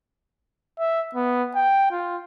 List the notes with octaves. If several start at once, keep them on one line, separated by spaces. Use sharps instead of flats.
E5
B3
G5
F4